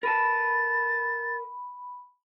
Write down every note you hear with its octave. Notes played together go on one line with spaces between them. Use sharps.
A#4 B4 A5 B5 A6